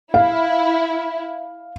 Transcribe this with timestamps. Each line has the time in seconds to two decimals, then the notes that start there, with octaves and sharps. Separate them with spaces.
0.14 E4 F5